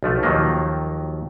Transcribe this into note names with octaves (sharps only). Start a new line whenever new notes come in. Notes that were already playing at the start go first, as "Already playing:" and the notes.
B1 F3 A3
D#2 D#3 F3 F#3 A#3